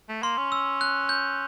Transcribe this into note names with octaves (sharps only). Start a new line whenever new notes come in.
A3
A#3 C6
C#4
E6
F#6
G6